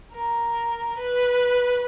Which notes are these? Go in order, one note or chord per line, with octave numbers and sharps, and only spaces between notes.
A#4
B4